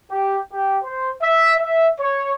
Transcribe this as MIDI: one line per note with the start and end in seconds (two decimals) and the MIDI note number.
0.11 0.38 67
0.53 0.79 67
0.84 1.11 72
1.23 1.54 76
1.60 1.89 76
2.00 2.32 73